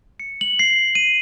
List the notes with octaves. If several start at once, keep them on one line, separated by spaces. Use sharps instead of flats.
C#7
F#7
C7
D#7